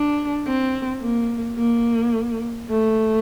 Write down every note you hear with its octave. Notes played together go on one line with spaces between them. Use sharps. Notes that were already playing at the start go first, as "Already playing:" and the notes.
Already playing: D4
C4
A#3
A#3
A3